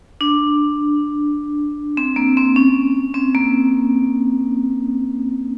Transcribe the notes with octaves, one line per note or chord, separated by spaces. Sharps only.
D4
C4
A#3
C4
C#4
C4
A#3